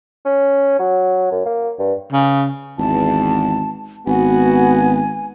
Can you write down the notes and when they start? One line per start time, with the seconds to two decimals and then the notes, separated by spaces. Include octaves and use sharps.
0.25 C#4
0.79 F#3
1.31 F#2
1.45 A#3
1.79 G2
2.13 C#3
2.78 G#1 E2 A5
4.06 G#1 B3 F#4 G#5